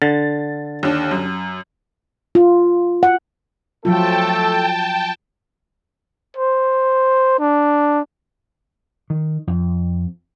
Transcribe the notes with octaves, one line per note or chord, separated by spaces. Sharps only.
D3 A6
D#2 D4
F#2
F4
F#5
F3 F#3 A3 F4 A4 G5 A5
C5
D4
D#3
F2